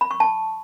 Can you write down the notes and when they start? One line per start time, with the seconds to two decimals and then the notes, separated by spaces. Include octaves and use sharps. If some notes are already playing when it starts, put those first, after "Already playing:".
0.01 B5
0.11 C#6
0.20 A5